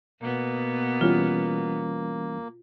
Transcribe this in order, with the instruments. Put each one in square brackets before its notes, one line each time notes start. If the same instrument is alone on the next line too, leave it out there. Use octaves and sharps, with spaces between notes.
[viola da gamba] B2 B3 [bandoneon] A#3
[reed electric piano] E3 G3 C#4 [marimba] F4